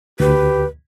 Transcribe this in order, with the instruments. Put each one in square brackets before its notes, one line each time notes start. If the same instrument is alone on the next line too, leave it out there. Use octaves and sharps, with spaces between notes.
[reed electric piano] D2 [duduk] G4 [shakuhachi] B4